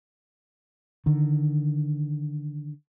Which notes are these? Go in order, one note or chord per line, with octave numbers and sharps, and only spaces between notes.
D3 D#3